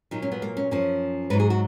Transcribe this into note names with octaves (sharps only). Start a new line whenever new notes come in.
A#2 F#3 D#4
C#4
B3
A#3
C#4
F#2 F3 C#4
G#2 F#3 B4
G#4
F#4